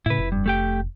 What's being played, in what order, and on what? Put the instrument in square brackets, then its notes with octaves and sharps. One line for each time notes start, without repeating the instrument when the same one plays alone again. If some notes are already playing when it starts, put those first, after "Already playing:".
[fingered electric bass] A2 C#3 [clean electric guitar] E4 B4
[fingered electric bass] F1
[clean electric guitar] G2
A3 G4 G5